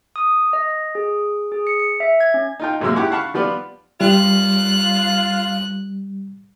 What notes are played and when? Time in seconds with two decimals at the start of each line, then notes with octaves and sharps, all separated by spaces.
0.16 D#6
0.53 D#5
0.95 G#4
1.52 G#4
1.67 C#7
1.80 C#7
2.00 E5
2.20 G#6
2.34 C#4
2.60 D#4 F4 G5
2.81 A1 F#2 C3 G#3 A#3 E6
2.96 E4 G4 F#5 G#5 C#6 D6
3.11 F5 F#5 A5 B5 C#6
3.34 F3 G3 B3 F4 B4 D5
4.01 G3 F4 F#6